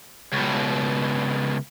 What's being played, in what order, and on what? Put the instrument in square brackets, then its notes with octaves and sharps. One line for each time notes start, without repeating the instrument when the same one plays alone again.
[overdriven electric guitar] C#2 B2